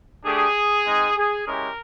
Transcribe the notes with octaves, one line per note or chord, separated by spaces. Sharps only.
A3 D4 G4 G#4
G#3 C4 D#4
G#4
G#3 C#4 E4 G4 A#4